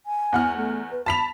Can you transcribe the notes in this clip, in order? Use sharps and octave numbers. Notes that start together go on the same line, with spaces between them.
G#5
E2 F#5 F6
A3
B4
A5 B5 B6 F7